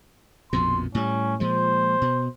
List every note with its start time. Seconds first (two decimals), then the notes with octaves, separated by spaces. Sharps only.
0.53 A#1 F2 B2 C6
0.95 A2 G3 C#4
1.40 A#2 F3 G#3 C5
2.02 B2